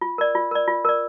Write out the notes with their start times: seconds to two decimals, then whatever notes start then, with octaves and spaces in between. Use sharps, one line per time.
0.01 F4
0.18 A#4 D5
0.35 F4
0.51 A#4 D5
0.68 F4
0.85 A#4 D5